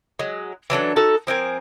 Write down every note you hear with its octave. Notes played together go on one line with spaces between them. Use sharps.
F#3 G#3
E3 F#3 D4 A4
D#4 F#4 A4 A5
F3 C4 A#4 G#5